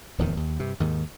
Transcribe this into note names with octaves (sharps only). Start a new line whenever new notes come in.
D1 E2 D#3
D#2
G2 C3
D#2 G#2 D#3